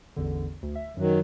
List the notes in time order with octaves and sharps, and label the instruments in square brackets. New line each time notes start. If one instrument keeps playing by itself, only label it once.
[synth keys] A1 E2 D3
D2
E5
[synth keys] F#2 [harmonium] D#3 F#3